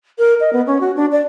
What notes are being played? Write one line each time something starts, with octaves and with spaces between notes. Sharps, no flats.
A#4
D#5
B3
C#4
F#4
D4
D5